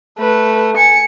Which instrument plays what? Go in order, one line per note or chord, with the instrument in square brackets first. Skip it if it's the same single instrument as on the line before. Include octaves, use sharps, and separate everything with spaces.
[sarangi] A3 [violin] B4
[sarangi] G#5 [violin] C#7